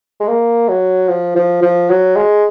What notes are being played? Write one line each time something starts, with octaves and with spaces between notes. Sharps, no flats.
G#3
A#3
F#3
F3
F3
F3
F#3
G#3